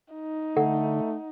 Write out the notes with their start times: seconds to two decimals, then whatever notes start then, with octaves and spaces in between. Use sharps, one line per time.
0.14 D#4
0.57 D3 A3 F#5